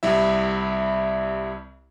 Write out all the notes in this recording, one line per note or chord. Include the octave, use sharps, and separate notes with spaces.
C2 G3 E4 E5